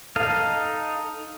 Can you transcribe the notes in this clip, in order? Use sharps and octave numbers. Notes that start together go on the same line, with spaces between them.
D#4 A4 D#5 F5